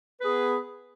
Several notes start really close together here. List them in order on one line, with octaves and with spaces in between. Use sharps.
B4 G#4 B3